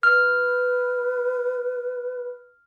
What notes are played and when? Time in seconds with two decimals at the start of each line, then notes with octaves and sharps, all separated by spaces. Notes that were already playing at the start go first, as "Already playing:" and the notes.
0.03 B4 F6